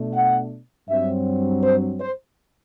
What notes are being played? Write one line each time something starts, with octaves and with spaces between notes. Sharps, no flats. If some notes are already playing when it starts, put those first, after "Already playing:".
Already playing: B2 A3 D4
F#5
G2 F#3 C4 E5
C5
C5